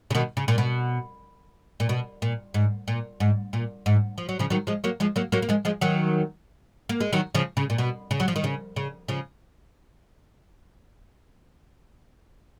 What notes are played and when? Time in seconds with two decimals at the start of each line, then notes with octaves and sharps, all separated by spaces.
0.10 C#3
0.15 B2 D#3
0.37 C#3
0.48 A#2
0.58 B2
1.80 A#2
1.89 B2
2.22 A#2
2.54 G#2
2.88 A#2
3.20 G#2
3.53 A#2
3.86 G#2
4.18 F3
4.29 F#3
4.39 C#3 F3
4.50 D#3 F#3
4.67 F3 G#3
4.84 F#3 A#3
5.00 F3 G#3
5.16 F#3 A#3
5.32 F#3 A#3
5.42 A#3
5.49 F3 G#3
5.65 F3 G#3
5.81 D#3 F#3
6.89 A#3
7.00 G#3
7.13 D#3 F#3
7.35 C#3 F3
7.57 C#3
7.70 A#2
7.78 B2
8.11 C#3
8.20 F#3
8.28 F3
8.36 D#3
8.44 C#3
8.76 C#3
9.08 C#3 F3